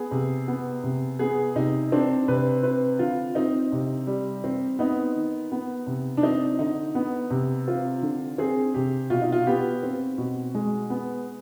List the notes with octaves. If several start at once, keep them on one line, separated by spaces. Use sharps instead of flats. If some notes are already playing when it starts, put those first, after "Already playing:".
Already playing: B3 G#4
C3
B3
C3
B3 G#4
C3 D#4
C4 D4
C3 B4
C4 B4
D3 F4
C4 D#4
C3
G3
C4
B3 D#4
D#3
B3
C3
D4
C4 D#4
D3 D#4
B3
C3
C4 F4
D3
C4 G#4
C3 G4
B2 F4
D#4
F4
B3 G4
C4
B2
G#3
B3